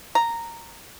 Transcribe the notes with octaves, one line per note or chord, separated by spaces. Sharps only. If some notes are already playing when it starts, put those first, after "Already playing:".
A#5